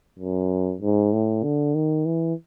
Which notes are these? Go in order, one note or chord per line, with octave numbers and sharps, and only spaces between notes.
F#2
G#2
A2
D3
D#3
E3